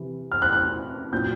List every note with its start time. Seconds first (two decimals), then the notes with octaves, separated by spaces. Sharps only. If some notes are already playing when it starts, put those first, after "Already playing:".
Already playing: C3 E3
0.32 F6
0.42 F#6
0.53 F#6
1.12 A#2 F#3 G6